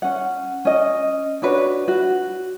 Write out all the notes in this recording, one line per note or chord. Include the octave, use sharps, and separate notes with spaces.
C#4 F#5
C#4 D#5
D4 F#4 B4 C#5
F#4